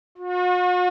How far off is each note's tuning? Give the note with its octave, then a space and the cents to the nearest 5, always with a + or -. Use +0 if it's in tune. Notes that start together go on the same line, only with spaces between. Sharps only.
F#4 -45